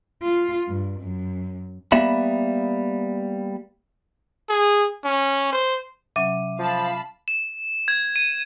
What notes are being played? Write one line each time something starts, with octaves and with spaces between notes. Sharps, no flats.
F4
G2
F#2
G3 A#3 B3 E5 B5
G#4
C#4
C5
C3 F#3 C#4 E5 D6 D#7
F3 F5 A5 B5
E7
G#6
D#7